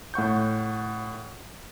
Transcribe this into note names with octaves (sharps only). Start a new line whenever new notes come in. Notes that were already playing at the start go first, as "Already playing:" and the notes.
A2 F#5 C#6 G6